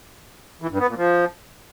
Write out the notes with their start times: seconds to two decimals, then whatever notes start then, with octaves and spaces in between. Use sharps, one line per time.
0.62 E3
0.71 G2
0.79 B3
0.88 A#2
0.97 F3